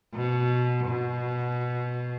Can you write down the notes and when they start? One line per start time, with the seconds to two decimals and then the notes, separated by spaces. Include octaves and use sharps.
0.15 B2
0.87 B2